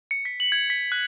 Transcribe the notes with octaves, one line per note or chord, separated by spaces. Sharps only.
C#7
B6
F#7
G#6
B6
F#6